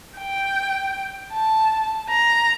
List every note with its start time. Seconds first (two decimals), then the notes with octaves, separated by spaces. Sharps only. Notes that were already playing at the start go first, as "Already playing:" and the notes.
0.18 G5
1.33 A5
2.09 A#5